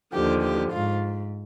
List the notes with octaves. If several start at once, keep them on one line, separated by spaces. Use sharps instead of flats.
D#2 D3 F3 G4
G4
G#2 F4